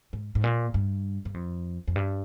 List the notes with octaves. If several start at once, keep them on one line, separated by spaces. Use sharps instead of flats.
G#2
G#2
A#2
G2
G2
F2
F2
G2